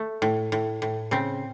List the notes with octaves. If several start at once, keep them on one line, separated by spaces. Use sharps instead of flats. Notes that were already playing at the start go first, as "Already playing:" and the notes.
Already playing: A3
A2
A2
A2
C#3 C4